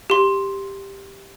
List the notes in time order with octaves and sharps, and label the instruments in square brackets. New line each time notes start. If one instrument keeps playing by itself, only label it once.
[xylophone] G4 C6